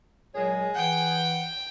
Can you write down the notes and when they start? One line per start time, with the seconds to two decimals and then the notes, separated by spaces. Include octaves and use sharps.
0.35 A#2 F#3 G#3 G#4 C#5
0.76 E3 F#5 G5